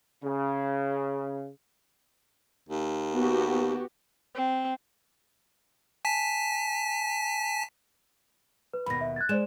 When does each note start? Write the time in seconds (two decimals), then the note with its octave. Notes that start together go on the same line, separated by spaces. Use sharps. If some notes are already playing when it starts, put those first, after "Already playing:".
0.22 C#3
2.69 D#2
3.13 B3 F#4 G4
4.35 C4
6.05 G#5 A5 B6
8.74 B4
8.86 D#2 B2 B5 A#6
9.01 E5
9.16 F#6 G#6 A6
9.29 G#3 C5 D5 E7